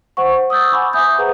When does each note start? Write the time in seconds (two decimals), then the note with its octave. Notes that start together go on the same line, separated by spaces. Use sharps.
0.17 C5 F#5 C#6
0.50 D#6 E6 G6 A6
0.71 F#5 G#5 B5 C#6 D6
0.93 E5 G#5 D#6 G6
1.18 G#4 B4 C5 F#5 A#5